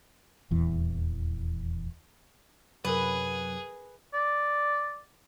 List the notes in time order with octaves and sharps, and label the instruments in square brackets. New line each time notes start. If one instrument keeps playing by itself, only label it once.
[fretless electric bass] D#1 E2 E3
[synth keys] F#2 C3 F#3 [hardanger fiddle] G#4 [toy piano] A#4 C#5 [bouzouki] B4
[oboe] D5